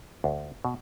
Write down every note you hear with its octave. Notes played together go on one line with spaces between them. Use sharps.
D2
B2